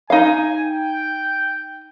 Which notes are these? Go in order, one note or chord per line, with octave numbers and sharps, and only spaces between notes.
D#4 F5 G#5
G5